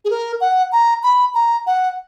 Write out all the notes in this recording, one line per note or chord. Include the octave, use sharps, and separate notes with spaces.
G#4
A#4
F#5
A#5
B5
A#5
F#5